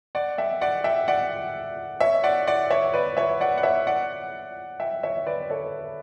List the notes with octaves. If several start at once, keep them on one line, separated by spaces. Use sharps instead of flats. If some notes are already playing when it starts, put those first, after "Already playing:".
D5 F#5
E5 G5
D5 F#5
E5 G5
D5 F#5
C#5 E5
D5 F#5
D5 F#5
C#5 E5
B4 D5
C#5 E5
D5 F#5
F#5
C#5 E5
D5 F#5
E5 G5
C#5 E5
B4 D5
A4 C#5